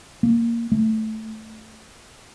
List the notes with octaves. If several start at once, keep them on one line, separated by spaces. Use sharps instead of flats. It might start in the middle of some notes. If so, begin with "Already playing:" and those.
A#3
A3